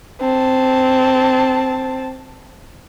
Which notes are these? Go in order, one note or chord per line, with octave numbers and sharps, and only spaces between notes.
C4 A5